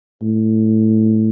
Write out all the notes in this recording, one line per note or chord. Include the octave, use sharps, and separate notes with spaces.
A2